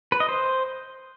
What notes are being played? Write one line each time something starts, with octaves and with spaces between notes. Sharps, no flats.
B4
D#5
C5